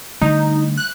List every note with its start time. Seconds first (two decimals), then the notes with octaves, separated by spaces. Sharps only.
0.21 D3 G3 A3 D#4
0.77 F#6